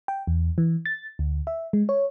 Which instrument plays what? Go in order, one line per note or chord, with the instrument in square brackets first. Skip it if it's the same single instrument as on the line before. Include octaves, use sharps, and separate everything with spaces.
[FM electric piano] G5
E2
E3
A6
D2
E5
G#3
C#5